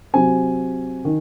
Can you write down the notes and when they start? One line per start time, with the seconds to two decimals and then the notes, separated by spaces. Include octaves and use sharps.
0.14 C3 F#3 C4 G#5
1.05 D#3